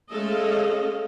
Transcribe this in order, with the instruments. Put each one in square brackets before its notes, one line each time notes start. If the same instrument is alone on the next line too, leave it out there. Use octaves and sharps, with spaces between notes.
[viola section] G#3 A3 C#4 A4 D#5 F5